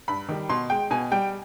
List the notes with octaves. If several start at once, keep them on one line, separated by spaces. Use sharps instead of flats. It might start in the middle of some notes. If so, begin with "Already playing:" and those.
G2 B5
D#3 G3
B2 C6
G#3 G5
B2 G#5
G3 G5